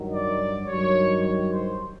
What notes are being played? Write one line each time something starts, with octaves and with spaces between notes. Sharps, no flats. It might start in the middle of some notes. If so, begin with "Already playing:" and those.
Already playing: G2 D#3 F#3
D5
G2 D#3 F#3 C#5
C#5
C5